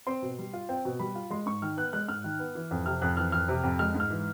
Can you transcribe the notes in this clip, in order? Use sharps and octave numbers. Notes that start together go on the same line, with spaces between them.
C4 C6
B2
G3
F4
C4 G5
B2
G3 B5
F4
G#3 C6
G#2 C#6
D#3 F6
B3 F#6
G#3 F#6
G#2 F6
D#3
B3
E3
F2
C3 F6
F2 F#6
E3 F6
F2 F6
C3
F2
G#3 F6
G#2
F6
E3